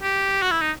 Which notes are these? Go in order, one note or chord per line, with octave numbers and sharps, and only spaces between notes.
G4
F#4
E4
D#4